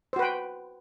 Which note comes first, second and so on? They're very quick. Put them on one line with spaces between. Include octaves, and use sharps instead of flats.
C5 F#4 B4 G5